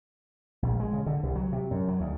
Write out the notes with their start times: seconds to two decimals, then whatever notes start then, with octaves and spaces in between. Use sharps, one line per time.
0.62 A#1
0.80 G#3
0.93 C#3
1.06 D3
1.23 C2
1.36 F#3
1.52 C3
1.71 F#2
1.88 F#3
2.00 D2